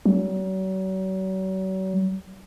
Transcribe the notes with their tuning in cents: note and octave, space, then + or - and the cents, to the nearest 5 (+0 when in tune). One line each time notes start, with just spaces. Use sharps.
F#3 +40